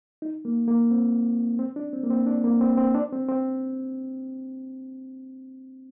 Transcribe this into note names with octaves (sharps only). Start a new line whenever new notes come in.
D#4
A#3
A#3
C4
C4
D4
C4
A#3
C4
D4
A#3
C4
C4
D4
C4
C4